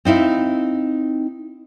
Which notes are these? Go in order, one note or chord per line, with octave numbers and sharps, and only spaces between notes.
C4 D#4 E4 F5